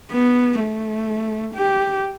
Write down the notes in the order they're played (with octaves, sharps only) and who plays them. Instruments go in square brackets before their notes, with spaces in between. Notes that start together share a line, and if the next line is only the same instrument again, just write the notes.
[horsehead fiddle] B3
A3
G4